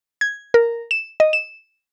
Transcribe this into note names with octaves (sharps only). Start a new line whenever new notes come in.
G#6
A#4
E7
D#5
E7